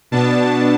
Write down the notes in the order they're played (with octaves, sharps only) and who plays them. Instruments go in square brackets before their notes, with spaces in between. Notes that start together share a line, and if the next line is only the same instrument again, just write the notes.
[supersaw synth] B2 B3 D4 A5